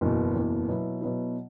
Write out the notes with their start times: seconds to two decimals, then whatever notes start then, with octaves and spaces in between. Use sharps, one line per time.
0.01 F#1 E2 B2
0.34 F#1 E2 B2
0.69 B2 F#3 B3 E4
1.01 B2 F#3 B3 E4